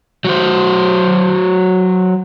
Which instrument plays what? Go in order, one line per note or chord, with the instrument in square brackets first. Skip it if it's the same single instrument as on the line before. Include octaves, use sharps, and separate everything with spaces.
[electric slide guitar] F#3 F#4 C5